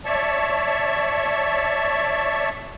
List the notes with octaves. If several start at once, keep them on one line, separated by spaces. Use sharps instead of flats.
C#5 D5 E5 A5 C#6